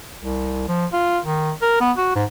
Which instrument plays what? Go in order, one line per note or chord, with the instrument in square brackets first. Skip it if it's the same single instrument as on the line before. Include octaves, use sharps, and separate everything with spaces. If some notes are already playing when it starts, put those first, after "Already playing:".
[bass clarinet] C2
F3
F4
D#3
A#4
B3
F#4
G#2